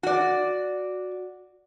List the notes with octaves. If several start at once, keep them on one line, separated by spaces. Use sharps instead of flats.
F#4 D5